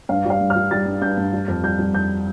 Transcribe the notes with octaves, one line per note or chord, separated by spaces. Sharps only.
G2 F5
G3 F5
G2
F6
G3
G3 A6
G2
G2 G6
G2
G3
F2
G3 G6
G3
F2 G6